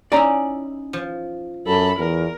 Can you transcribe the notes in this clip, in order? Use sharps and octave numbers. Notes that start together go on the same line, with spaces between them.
C#4 D#4 E4 D5 A#5
F3
F#2 A4 B5
E2 A#4